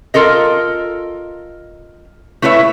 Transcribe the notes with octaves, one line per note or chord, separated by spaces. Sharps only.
F4 A4 A#4 D#5
A3 E4 B4 C#5 E5